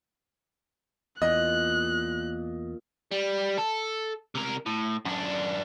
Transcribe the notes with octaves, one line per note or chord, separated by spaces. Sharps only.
E2 A#2 D#5 F#6
G3
A4
C3 A#4
A2
F#2 D4